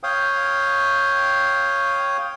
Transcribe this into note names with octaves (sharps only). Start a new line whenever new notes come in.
C#5 F5 G5 D#6